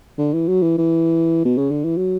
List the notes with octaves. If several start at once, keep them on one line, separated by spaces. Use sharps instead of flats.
D3
E3
F#3
E3
E3
B2
C#3
D3
E3
F#3